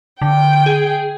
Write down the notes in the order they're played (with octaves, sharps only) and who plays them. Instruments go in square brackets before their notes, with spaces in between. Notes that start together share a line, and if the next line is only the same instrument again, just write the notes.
[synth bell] D3 [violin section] G5
[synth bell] G#4